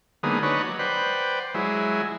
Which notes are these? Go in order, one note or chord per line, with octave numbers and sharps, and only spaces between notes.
D3 F#3 G#3 A#3 B3 D#4
D4 D#4 F#4 B4 C#5
F#3
B4 C5 D5 F#5 G5
F#3 G#3 E4